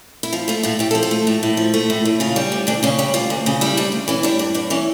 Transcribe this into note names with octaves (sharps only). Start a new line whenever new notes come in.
E4
F3 F4
A3 F4
A2 F4
A2 G4
A4
F3
A4
A3
A2
A2
F3
A3
A2
A2
C#3 F4
G3
D2
D2 D4
C#3 C#4
G3 G4
D2 F4
D2
C#3
G3 E4
D2 D4
D2
E3 C#4
G3 D4
G2 D4
G2 D4
E3 C#4